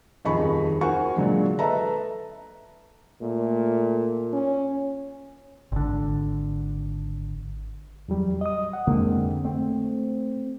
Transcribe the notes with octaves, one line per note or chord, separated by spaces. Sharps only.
D#1 F2 D#4 G#4 B5 C#6
F#4 A#4 C5 F#5 G#5 C#6
A#2 D3 F#3 G#3
A4 B4 D#5 E5 A5 A#5
A#2 A3
C#4
G#1 D3
E2 F#3 G3
D#5 D#6
F#5
F2 D3 G#3 A#3 C4
A3 C4